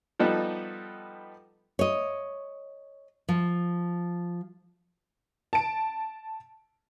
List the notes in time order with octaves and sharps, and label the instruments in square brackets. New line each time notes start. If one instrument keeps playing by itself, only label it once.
[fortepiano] F3 G3 B3 D#4 A4
[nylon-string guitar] C#5 D#5
F3
[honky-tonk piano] A5 D7